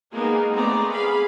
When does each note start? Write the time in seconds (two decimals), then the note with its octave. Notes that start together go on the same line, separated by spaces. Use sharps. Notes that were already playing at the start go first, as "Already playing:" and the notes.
0.13 G#3 A#3 B3 D#4 G#4 A#4
0.53 A3 B3 C4 G#4 D5 A#5
0.92 G#4 F5 B5